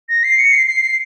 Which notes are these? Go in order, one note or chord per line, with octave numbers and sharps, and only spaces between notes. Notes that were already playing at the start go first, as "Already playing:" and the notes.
A#6
C7
C#7
C7
C7
C7